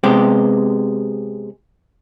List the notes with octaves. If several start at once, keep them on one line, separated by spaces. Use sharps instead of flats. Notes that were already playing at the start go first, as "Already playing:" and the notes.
C3 G#3 B3 G4